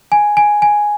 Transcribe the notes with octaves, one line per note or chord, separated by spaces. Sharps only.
G#5
G#5
G#5